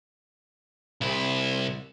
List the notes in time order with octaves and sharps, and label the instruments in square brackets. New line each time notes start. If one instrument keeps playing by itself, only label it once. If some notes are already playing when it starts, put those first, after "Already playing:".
[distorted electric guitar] C2 E4